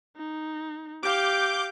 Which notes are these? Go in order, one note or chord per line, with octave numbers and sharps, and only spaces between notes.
D#4
G4 F5 D6 G6